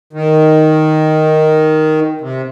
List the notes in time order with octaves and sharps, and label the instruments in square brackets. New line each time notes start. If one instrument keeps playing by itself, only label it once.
[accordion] D#3
C3